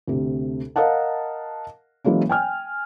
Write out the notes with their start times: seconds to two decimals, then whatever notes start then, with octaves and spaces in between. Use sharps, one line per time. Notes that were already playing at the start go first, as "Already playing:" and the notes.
0.07 D2 C3
0.76 A#4 D#5 F5 F#5 A5
2.04 E3 F#3 G#3 A#3 C#4
2.29 G5 G#5 F6